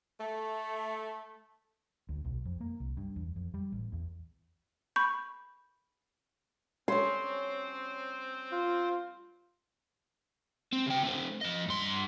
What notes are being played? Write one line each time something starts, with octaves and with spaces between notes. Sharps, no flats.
A3
D2
B1
F2
A#3
C2
G2
E2
F2
G3
A1
E2
B5 C#6 G6
C4 C#4 C5 C#5 C6
F4
C4
C#3 G5
A3 C4
F3 D#5
G2 C6